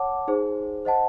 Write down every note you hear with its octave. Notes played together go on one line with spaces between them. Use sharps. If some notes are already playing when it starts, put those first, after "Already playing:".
Already playing: C#5 F#5 A5 D6
D#4 G#4 C5
C5 D#5 F#5 A5